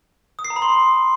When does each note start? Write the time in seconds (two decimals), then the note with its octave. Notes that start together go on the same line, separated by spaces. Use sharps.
0.39 D#6
0.45 C7
0.50 A#5
0.56 B5
0.62 C6